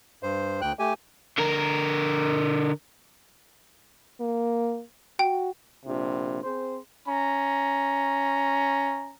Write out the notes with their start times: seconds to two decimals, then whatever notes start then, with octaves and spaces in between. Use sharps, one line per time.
0.23 G2 C5
0.61 D2 G5 F#6
0.79 A3 G4 G#5
1.38 D3 A#4
4.20 A#3
5.19 F#4 G5
5.86 A#1 C3
6.43 C4 G#4 C5
7.08 C#4 A#5